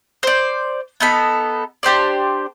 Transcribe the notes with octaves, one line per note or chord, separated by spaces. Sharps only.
C5 D5
B3 D#4 A4 B5
D4 G4 C5 D5